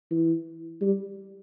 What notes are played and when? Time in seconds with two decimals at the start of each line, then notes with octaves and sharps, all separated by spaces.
0.11 E3
0.81 G3